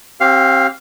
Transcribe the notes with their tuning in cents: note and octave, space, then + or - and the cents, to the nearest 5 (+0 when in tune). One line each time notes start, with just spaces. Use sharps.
C4 +30 G4 -20 F5 +0